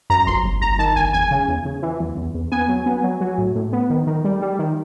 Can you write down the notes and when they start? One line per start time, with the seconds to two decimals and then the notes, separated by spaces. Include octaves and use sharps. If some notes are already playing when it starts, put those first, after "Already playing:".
0.10 F#2 A#5
0.27 G1 C6
0.44 G1
0.61 G1 A#5
0.78 D#3 A5
0.96 G1 G#5
1.13 E2 G#5
1.31 C#3
1.48 E2
1.65 C#3
1.82 E3
2.00 E2
2.17 E2
2.34 E2
2.52 B3 G#5
2.69 F#3
2.86 B3
3.03 F#3
3.21 F#3
3.38 A2
3.55 A2
3.73 B3
3.90 D#3
4.07 D#3
4.24 G3
4.42 G3
4.59 D#3